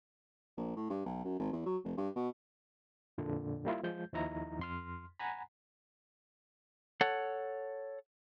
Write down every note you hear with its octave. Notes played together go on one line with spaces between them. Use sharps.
A#1
A2
G2
B1
F#2
G#1
E2
F#3
F1
G2
B2
F2 A#2 D3 D4
G3 A#3 E4 F4
F3 G#3 G6
D#2 F3 D#4 E4 A#5
F2 C6 F6
F#5 G#5 A#5 B5
A4 C#5 F#5